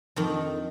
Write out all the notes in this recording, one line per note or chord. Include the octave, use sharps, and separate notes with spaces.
F2 D#3